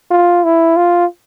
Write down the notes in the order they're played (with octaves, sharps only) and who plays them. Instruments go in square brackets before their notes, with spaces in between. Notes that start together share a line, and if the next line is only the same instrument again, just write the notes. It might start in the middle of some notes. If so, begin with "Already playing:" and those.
[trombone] F4
E4
F4